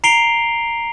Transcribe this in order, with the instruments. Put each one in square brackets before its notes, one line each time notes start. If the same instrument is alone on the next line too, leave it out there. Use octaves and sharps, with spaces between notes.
[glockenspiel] A#5 C7 D7 F7 G7